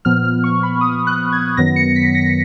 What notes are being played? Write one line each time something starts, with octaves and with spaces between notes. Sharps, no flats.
A#2 F3 B3 F6
F6
C#6
B5
D#6
F#6
G#6
F#2 D#3 F#3 B3 A#6
C#7
B6
A#6